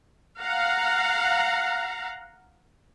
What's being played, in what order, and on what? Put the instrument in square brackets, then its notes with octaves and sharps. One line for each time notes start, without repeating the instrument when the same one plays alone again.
[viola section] F5 F#5 A#5